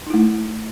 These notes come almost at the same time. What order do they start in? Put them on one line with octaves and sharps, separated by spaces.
D#4 E4 A3